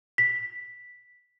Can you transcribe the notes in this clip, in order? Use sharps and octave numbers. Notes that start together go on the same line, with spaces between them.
B6